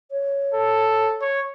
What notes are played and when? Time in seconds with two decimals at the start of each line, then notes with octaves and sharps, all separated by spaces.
0.11 C#5
0.54 A4
1.21 C#5